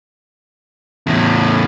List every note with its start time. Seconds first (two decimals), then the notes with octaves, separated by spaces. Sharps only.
1.07 E2 A2